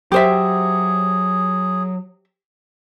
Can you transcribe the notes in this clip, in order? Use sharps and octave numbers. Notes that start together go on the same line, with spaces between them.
F#3 G4 G#4 C5 E5